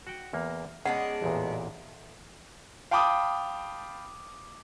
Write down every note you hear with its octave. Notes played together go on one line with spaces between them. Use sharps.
F#4 F#5 G5
E2 A#3
G#3 B3 C#4 D4 G#4 F#5
A1 E2 A#2
F5 G5 A5 B5 D6 D#6